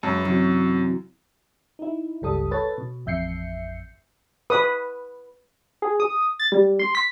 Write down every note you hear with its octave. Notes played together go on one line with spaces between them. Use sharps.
F#2 G#3 B4
C3 E3 F#3
D#4 E4
G1 C#2 G3 A4 D#6
A4 B4 C#5 A6
B2
A1 F2 E5 G6 C7 C#7
B4 D#6
G#4
D#6
A6
G3
C6
B6